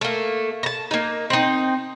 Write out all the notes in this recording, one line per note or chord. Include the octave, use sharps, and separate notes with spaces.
A3 A#3
A5 A#5
A#3 D#4
C4 D#4